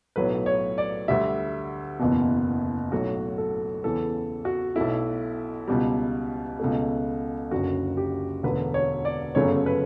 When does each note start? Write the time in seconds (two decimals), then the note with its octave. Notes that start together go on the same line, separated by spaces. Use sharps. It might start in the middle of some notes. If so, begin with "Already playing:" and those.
0.16 B1 A2 F#3 A3 B4
0.46 C#5
0.78 D5
1.08 D2 D3 G3 E5
1.99 F#1 E2 B2
2.92 B1 A2 F#3 A3 F#4
3.38 A4
3.84 E2 C#3 E3 A4
4.45 F#4
4.76 B1 B2 A3 E4
5.68 C#2 B2 G3
6.60 C#2 B2 A3
7.51 F#1 F#2 D3 F#4
7.97 G4
8.43 E1 D2 D3 B4
8.74 C#5
9.05 D5
9.35 G1 F#2 C#3 F#3 A3 C#5
9.66 B4